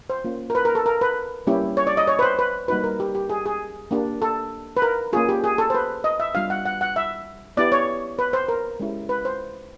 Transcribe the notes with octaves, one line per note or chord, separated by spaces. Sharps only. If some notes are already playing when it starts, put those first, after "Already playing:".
C5
A#3 C#4 F4
A#4
B4
A#4
A4
A#4
B4
G3 A#3 C#4 E4 G4
C#5
D5
D#5
C#5
B4
C5
B4
G3 A#3 D#4 F#4 B4
A#4
G4
G4
G#4
G#4
A#3 D4 G4
A4
B4
A#4
A#3 C#4 F4 G#4
G4
G#4
A4
C5
B4
D#5
E5
G3 B3 D4 F4 F5
F#5
F#5
F#5
E5
B3 E4 G4 D5
C#5
B4
C5
A#4
G#3 C#4 E4 G4
B4
C5